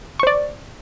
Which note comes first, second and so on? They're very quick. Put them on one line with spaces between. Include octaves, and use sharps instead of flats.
C#6 C5 D5